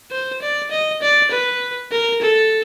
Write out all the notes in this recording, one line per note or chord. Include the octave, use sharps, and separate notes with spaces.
C5
D5
D#5
D5
B4
A#4
A4